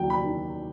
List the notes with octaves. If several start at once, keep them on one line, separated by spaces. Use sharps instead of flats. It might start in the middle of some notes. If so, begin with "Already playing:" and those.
Already playing: D#2 F#3 G5
B5
D#3